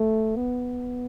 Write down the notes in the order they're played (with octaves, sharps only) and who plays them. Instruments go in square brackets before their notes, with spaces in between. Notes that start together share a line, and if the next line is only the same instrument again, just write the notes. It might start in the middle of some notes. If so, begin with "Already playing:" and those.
Already playing: [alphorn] A3
B3